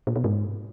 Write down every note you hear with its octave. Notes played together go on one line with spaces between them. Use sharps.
A#2
B2
G#2